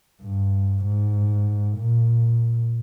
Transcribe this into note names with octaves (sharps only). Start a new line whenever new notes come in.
G2
G#2
A#2